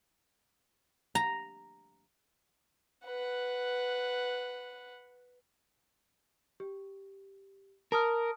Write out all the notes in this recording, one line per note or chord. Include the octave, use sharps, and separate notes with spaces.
A#5
B4 F#5
G4
A#4 A5 D#6 F6